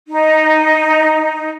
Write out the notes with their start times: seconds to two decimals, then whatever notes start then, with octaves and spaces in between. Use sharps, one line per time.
0.08 D#4